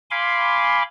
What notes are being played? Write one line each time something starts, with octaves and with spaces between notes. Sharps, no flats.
F5 G#5 B5 C6 D6